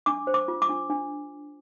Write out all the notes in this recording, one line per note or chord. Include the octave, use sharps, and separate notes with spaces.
D4 D6
C5
D6
F4
D6
D4
D4